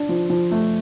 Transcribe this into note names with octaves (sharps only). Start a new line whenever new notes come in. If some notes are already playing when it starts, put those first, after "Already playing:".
Already playing: D4
F3
F3
A3